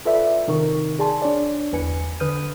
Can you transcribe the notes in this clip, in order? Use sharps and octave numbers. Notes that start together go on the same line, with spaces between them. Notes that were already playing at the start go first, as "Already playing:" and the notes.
F4 A4 B4 D5 E5
C3 D#3 D#4 A#4 C#6
G#4 D5 G#5 A5 C6
D4 C#5 D5
G1 E2 B4 G#5 C#7
D3 B4 D#6 F6 G6 D#7